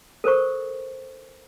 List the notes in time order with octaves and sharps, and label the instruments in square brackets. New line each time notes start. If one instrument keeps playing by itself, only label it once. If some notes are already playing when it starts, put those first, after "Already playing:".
[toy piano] A4 A#4 C5 C#6